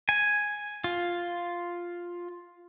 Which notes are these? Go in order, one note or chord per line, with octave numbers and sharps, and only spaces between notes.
G#5
F4